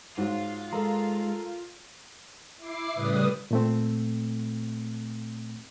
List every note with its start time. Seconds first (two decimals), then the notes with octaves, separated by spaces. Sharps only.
0.17 G#2 F#3 F4
0.73 G#3 A4 A#4 A#5
2.58 E4 D6 C7
2.94 A2 C#3 G3 B4 D#6
3.51 A#2 A3 C4